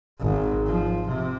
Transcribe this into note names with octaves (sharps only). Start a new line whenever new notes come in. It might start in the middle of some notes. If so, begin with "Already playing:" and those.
G#1
F3
C3